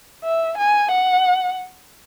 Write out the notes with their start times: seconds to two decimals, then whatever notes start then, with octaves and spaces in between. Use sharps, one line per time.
0.24 E5
0.58 G#5
0.92 F#5